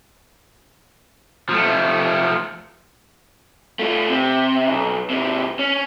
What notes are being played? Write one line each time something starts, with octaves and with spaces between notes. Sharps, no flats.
F3 A3
A3 F4
C3
B1
G#2 C3
C#4